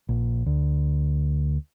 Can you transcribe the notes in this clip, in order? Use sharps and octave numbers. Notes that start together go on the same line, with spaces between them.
A#1
D2